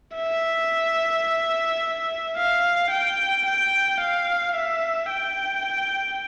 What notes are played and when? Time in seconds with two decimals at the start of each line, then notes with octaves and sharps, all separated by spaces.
0.16 E5
2.37 F5
2.91 G5
3.46 G5
4.00 F5
4.55 E5
5.10 G5